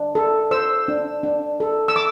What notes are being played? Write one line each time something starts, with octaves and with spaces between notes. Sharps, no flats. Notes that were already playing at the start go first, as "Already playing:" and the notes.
Already playing: D4
A4
C5 E6
D4
D4
A4
E6
D6